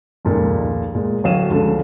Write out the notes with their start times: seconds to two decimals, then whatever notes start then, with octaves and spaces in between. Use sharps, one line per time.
0.25 F1 C#2 A#2 D#3
0.95 A#2 G#3
1.24 D1 C#5 F5 D#7 E7
1.50 C#2 D3 F3